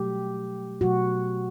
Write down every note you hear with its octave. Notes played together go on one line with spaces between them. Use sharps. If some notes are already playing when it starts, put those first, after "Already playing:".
Already playing: B2 F#3 A3 G4
B2 F#3 A3 F#4